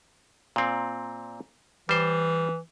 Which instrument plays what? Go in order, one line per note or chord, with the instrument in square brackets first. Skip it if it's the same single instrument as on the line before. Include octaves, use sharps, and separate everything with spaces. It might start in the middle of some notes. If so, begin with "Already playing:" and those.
[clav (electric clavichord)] A#2 C4
[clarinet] E3 [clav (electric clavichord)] G3 C5